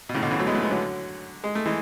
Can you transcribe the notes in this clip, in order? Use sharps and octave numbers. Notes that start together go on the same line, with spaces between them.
B2
A2 C#3
B2 D3
C#3 E3
F#3 A3
G#3 B3
F#3 A3
G#3 B3
D3 F#3
G#3
A3
E3 G#3